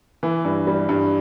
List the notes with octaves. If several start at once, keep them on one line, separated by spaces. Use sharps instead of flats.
E3
G2
G3
G2